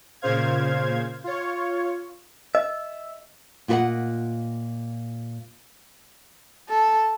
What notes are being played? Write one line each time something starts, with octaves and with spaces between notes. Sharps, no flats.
A#2 C#3 C5 F5 G#6
F4 C#5
D#5 E5
A#2 F4 G4 B4 D#5 F#5
A4